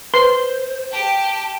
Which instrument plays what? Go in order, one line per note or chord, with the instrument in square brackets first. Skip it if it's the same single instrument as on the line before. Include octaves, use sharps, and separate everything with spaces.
[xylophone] B4 [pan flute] C5 [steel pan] C6
[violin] G4 G5 [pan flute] A5